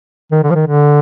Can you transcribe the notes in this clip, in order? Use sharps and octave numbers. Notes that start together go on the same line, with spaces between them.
D#3
D3
F3
D#3
D3